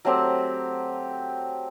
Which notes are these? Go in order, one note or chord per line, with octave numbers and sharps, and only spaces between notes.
F#3 A3 C4 G4